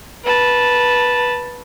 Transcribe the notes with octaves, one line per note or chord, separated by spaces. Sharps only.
B4 A5